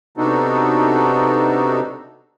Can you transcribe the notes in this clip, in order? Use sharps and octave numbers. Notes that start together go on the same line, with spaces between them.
C3 B3 D4 D#4 F#4 A4